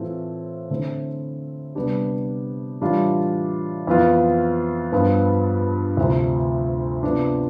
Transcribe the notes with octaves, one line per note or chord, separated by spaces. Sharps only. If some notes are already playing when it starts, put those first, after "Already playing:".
Already playing: A2 E3 A3 C4 F4
D3 A3 C4 E4
C3 G3 B3 D4 G4
A2 E3 G3 D4 F4
F2 E3 B3 F4
G2 F3 B3 F4
D2 C3 F3
C3 F3 B3 D4